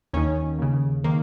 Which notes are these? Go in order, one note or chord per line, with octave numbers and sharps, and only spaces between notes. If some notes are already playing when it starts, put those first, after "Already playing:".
D#2 D#3 C#4
D#2 C#3
D#3 A#3